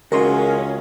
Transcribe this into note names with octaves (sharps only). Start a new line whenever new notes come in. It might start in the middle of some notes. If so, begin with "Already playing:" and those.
C#2 G#3 C#4 F#4 A#4 C6